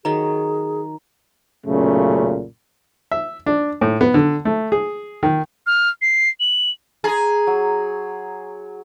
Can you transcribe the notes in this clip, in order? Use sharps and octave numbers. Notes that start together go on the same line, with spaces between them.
D#3 F#3 G#4 A#5
B1 F#2 A#2 C#3 A3
E5
D4
A2
B3
D3
A3
G#4
D#3
F6
C7
F#7
G#4 A#5 C6
F#3